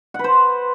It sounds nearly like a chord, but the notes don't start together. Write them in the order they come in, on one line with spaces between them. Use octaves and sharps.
F#5 B4 C5